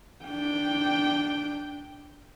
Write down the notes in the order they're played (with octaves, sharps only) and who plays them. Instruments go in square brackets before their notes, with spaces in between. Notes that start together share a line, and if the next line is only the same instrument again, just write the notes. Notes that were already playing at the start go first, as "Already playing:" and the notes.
[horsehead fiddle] D4 G5